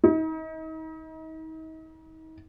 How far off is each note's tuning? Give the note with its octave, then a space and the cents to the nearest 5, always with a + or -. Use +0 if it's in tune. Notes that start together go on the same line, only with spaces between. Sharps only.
D#4 +40